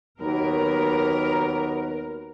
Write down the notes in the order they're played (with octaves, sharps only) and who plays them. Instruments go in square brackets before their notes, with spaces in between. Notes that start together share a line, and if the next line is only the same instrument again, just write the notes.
[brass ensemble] D#2 F#3 B3 [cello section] A#4